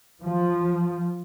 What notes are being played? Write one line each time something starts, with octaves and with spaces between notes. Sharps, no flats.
F3